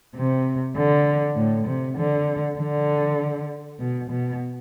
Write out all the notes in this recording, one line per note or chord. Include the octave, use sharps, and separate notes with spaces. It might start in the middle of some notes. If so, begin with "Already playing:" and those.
C3
D3
A2
C3
D3
D3
B2
B2